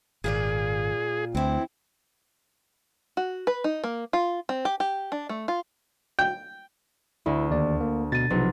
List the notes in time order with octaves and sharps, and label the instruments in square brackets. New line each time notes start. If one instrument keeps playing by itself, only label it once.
[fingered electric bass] G#1 [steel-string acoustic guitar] A#2 F4 D5 [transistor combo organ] G#4
[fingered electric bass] D2 [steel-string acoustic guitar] E3 E4 [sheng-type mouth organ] C4
[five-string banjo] F#4
B4
D#4
A#3
F4
C4
G4
G4
D4
A3
F4
[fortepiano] G5
[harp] D2 [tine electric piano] E4
[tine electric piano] D#2 D5
A#3
[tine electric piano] B2 [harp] A6 D#7
[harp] B1 [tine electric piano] C3 F3